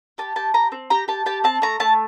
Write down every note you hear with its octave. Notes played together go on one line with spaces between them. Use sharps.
G4 A5
G4 A5
G4 A#5
C4
G4 A#5
G4 A5
G4 A5
C4 A5
A3 A#5
A3 A5